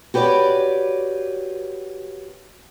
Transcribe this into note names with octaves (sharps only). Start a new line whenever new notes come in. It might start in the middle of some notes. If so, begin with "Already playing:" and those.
F#4 G4 B4 C#5 D5